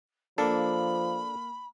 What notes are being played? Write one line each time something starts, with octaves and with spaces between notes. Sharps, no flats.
F3 A#3 D4 A4 B5